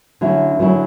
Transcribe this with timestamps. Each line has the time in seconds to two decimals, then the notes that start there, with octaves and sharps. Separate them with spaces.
0.21 D3 F#3 A3 C#4 E4
0.59 D3 F#3 A3 C#4 E4